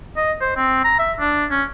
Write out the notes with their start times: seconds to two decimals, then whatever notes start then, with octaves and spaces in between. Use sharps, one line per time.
0.16 D#5
0.41 C5
0.57 C4
0.84 A#5
0.99 E5
1.20 D4
1.51 C#4